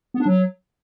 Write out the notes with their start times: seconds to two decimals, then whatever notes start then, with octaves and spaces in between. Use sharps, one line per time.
0.14 B3
0.20 D4
0.26 F#3